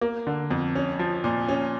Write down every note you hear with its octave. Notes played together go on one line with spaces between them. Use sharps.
A#3
D3
F2
C#4
F3
A#2
C#4